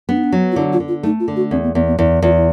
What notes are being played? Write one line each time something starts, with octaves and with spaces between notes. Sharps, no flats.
B3 D4
D#4
D4
F#3
F4
D3 E4
F4
D3
F4
A3 D#4
F4
D3
F#4
E2 C4
B3
E2 B3
B3
E2 E4
E2 F4
E4